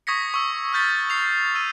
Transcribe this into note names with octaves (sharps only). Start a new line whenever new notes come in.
C#6 D#6 G#6 A#6 B6 C#7
C#6 E6 A#6
E6 F6 G6 A6 B6
C7 F7
E6 D#7 F7 G7